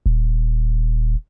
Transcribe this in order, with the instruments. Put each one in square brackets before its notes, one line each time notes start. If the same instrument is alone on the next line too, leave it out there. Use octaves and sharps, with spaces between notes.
[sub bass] D#1